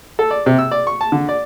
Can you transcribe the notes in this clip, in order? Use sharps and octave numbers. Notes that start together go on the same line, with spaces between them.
A4
D5
C3
E6
D5
C#6
A5
D3
D5